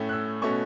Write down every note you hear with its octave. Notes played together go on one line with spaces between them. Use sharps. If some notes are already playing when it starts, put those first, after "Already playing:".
Already playing: A2 A3 C#4
F#6
E6
B2 A3 C#4 C#6